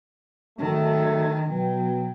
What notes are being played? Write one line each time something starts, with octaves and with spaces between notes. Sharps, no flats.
G#1 D#3 F#3 A3
B2 F#3 G5